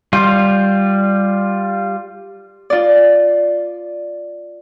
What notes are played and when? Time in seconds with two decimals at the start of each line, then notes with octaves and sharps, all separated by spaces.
0.13 G3 F4
2.70 F4 D5